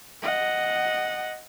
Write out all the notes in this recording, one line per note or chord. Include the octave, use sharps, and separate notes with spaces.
D#5 F#5